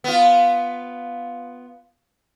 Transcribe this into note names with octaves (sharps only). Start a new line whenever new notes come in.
B3 F4